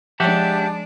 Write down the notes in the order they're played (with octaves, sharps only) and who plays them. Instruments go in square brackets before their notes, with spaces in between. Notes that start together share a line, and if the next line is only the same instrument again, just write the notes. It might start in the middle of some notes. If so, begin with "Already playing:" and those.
[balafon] F3 [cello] G#3 D4 [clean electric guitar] G4 E5 F#5 [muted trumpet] A5